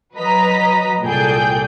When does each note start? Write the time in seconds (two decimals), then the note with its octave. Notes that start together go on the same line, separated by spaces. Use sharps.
0.15 F#3 B4 D#5 A#5 B6
1.03 C2 A#2 G#4 A4 G5 G6